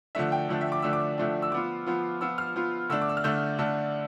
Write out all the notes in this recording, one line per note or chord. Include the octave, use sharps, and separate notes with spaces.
D3 F3 A3 D4 E5
G5
D3 F3 A3 D4
E5
D6
D3 F3 A3 D4 E6
D6
D3 F3 A3 D4
E6
F3 B3 F4 D6
F3 B3 F4
F3 B3 F4 E6
F6
F3 B3 F4
D3 A3 D4 E6
D6
E6
F6
D3 A3 D4 G6
D3 A3 D4